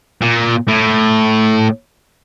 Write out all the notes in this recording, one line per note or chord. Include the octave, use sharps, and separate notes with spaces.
A#2
A2